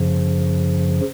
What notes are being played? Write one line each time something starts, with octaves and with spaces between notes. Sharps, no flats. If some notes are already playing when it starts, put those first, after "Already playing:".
Already playing: F#2 C#3 F3